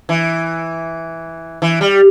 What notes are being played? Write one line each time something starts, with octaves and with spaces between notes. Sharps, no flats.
E3
E3
G3